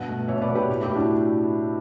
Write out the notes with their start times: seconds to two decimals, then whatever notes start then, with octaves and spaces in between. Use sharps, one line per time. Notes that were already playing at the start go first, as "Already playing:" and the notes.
Already playing: G2 B2 F#5
0.08 A3
0.28 B2 C#5 E5
0.42 B4 D5
0.49 B2
0.55 G4 B4
0.69 A2
0.82 E4 G4
0.90 A2
0.95 D4 F#4